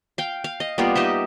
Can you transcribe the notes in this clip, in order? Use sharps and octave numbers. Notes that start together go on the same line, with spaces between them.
F5 G5
F5
D#5
G3 A#3 B3 F4
D#4 G4 D#5 E5